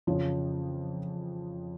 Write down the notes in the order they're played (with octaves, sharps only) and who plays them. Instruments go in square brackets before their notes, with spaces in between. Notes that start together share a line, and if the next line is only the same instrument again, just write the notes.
[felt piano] F2 C#3 F3